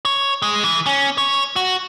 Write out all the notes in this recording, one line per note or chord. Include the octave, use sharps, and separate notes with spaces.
C#5
G#3
E3
C#4
C#5
F#4